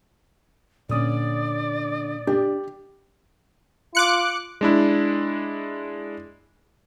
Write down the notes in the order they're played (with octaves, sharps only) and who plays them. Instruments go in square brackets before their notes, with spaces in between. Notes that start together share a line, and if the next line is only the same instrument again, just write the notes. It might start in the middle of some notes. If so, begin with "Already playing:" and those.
[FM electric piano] A#2 D#6 [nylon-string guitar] D3 C#4 [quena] D5
[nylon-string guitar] D4 [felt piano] G4
[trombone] F4 [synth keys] D6 F#6 C#7
[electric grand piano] G#3 D4 E4